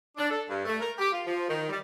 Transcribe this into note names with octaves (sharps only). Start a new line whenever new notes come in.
D4
A4
G2
A3
A#4
G4
F4
F3
D#3
G3